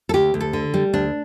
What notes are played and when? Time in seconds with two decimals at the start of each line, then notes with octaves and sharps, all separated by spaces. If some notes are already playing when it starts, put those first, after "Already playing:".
0.09 A4
0.14 D2 G4
0.34 D2
0.40 A4
0.53 D3
0.74 G3
0.93 D2 D4